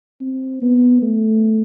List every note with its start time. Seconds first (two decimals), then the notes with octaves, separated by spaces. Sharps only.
0.21 C4
0.62 B3
1.02 A3